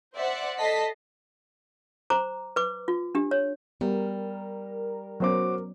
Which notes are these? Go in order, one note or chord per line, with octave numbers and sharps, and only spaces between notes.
C5 D5 E5 F#5
A4 D#5 A5 B6 C7
C5 A#5 D6
B4 D6
F4
D4 G4
C#5
G3 B3 A#4
F#3 B3 C#4 F#4 C5 D6